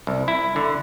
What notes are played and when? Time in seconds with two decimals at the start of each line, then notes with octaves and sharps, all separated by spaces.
0.07 C2
0.28 E4
0.56 D3